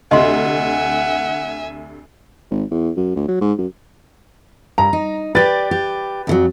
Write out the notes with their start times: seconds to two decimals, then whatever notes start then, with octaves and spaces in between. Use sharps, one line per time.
0.11 D2 C3 D#5 E5 F#5 G#5 C6
2.50 G#1
2.71 E2
2.96 F#2
3.16 D2
3.28 F#3
3.41 G#2
3.58 F#2
4.78 G2 A#5
4.93 D#4
5.35 G4 B4 D5 A6
5.71 G4
6.27 F2 D#3 F#3